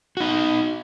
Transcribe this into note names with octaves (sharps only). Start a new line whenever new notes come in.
D#4 F#4